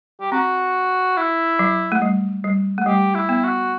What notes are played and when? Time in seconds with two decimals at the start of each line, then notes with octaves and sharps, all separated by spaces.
0.21 G4
0.32 C4 F#4
1.17 E4
1.59 F#3
1.92 A3
2.02 G3
2.44 G3
2.78 A3
2.86 G3 G4
3.15 E4
3.29 B3
3.44 F#4